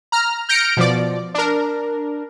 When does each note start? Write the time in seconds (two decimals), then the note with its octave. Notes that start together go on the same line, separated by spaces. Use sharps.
0.12 A#5 F6
0.49 F6 G6 A#6 C#7 D7
0.77 B2 F3 D5
1.34 D4 A#4